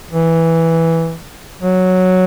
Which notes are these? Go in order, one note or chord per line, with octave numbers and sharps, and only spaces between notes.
E3
F#3